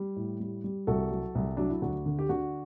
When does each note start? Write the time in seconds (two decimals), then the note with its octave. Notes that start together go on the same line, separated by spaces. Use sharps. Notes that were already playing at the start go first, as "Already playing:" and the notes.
Already playing: G3
0.16 A2
0.40 G3
0.64 G3
0.87 C2 F#4 A4
1.11 F#3
1.35 C2
1.57 F#3 D4
1.70 E4
1.82 D2 D4 F#4
2.06 D3
2.19 G4
2.29 D3 D4 F#4